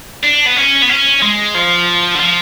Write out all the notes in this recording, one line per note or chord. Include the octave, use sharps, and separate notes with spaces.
D4
B3
C#4
B3
C#4
G#3
F3
D3
F3